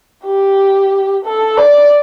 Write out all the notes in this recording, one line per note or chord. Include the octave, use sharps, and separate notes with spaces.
G4
A4
D5